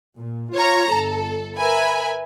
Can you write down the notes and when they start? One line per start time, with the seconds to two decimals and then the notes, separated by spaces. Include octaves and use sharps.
0.17 A#2
0.55 F4 C#5 A#5
0.92 G1 A4
1.57 A#4 B4 E5 G#5 B5